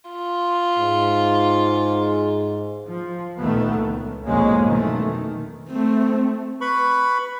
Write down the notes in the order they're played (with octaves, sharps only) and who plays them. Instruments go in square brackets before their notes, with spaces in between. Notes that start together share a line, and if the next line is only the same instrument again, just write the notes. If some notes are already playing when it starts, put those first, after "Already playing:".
[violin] F4
[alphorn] G#2
[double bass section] F3
A#1 D#2 D#3 A3 B3
C#2
B1 F2 G#2 G#3 A#3 C#4
B2 D#3 E3 A3
D#3
[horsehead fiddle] A3 C4
[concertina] B4 B5 C#6